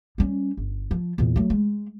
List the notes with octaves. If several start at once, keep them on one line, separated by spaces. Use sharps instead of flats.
G3 C#4
G1
F3
E2 A#2
F#3 A3
G#3